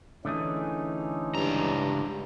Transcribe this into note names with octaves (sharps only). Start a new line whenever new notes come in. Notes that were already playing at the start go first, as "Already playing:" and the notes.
D3 E3 A3 C#4 D#4 G#4
C#2 G2 A#5